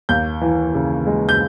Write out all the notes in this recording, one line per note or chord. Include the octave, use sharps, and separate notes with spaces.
D#2 G6
E3
C#3
G#3
G6